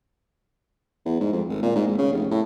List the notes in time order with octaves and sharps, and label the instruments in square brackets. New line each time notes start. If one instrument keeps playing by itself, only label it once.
[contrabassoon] E2
G#2
F2
G#1
A#2
G#2
G#1
C#3
F1
A2